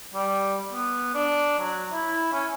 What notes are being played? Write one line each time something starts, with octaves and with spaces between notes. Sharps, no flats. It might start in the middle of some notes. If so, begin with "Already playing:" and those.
G3
B3
D4
F#3
E4
C#4